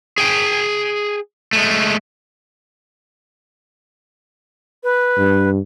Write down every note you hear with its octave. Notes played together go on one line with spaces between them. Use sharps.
G#4 G5
G#3 A3
B4
G2